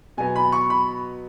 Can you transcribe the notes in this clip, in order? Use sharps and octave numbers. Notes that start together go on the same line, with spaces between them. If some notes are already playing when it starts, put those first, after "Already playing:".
B2 F#3 B3 G#5
B5
C#6
B5